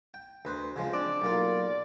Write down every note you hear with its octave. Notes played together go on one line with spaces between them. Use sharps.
G5
D2 B4 C5
C#3 F3 G#3
C4 D4 D5
B1 A#3 F4